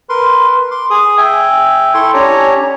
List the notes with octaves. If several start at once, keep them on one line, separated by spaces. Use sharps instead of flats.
A#4 B4 C6
C6 D6
G#4 D#6
E5 G5 G#5
E4 A4 G5 C6 C#6
C#4 D4 G4 C#5 G#5 A#5